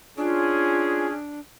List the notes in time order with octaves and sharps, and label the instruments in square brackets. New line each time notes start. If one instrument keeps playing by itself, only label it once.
[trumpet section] C#4 G#4 [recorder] D4 [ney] F4